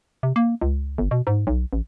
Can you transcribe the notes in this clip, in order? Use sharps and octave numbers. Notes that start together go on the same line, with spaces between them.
C3
A#3
C#2
G1
B2
G#2
B1
A1